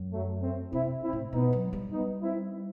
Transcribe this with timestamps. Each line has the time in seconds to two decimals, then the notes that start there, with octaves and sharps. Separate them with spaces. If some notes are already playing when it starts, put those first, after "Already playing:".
Already playing: F#2
0.12 F#3 A3
0.42 A3 C4
0.73 C3 C4 E4
1.03 C4 E4
1.13 A2
1.33 B2 B3 D#4
1.53 F#3
1.73 G3
1.92 B3 D#4
2.22 C4 E4